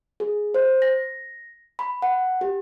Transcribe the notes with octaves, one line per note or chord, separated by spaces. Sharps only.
G#4
C5
A#6
B5
F#5
G4